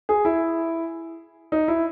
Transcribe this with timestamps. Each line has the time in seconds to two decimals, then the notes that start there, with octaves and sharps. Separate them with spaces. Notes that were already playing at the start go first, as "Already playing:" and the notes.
0.09 G#4
0.25 E4
1.52 D#4
1.68 E4